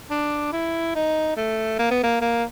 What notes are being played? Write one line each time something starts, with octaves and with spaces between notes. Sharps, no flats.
D4
E4
D#4
A3
A#3
B3
A#3
A#3